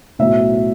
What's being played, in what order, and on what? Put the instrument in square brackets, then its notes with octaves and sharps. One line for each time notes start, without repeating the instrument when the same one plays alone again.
[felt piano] B1 A2 F#3 E5